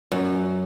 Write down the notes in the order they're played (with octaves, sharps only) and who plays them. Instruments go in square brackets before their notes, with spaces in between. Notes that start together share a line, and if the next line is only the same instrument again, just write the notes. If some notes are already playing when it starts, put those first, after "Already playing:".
[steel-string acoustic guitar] F#2